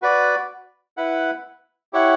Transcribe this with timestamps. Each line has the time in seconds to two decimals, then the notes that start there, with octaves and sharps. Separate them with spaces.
0.02 F#4 B4 D5
0.97 E4 B4 F#5
1.93 E4 G4 C#5 F#5